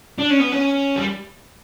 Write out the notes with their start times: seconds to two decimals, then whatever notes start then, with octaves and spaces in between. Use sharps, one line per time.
0.18 D4
0.30 C#4
0.40 B3
0.52 C#4
0.96 G3